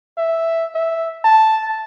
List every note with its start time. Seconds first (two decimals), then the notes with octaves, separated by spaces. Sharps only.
0.18 E5
0.75 E5
1.24 A5